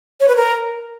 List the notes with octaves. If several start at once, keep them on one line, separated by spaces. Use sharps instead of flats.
C#5
B4
A#4